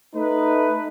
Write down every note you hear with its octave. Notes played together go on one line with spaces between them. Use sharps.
A3 D#4 B4